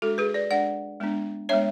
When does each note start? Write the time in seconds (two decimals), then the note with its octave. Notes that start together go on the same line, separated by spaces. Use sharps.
0.02 G#3 D4 F#4 A4
0.18 G#4 B4
0.34 B4 D5
0.51 G#3 D4 D5 F#5
1.00 G#3 B3 D4
1.49 G#3 B3 D4 C#5 E5